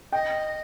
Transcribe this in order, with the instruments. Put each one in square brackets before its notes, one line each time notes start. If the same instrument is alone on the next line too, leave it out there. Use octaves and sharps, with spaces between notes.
[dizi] D#5 [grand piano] G5